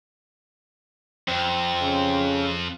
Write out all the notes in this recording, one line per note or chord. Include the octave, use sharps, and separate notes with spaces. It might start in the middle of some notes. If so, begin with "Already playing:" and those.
F2 C4
C#3